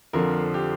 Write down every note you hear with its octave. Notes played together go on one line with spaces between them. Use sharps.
F2 D3 F3 A#4
G4